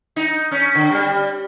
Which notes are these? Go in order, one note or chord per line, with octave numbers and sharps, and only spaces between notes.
D#4
C#4
D3
G3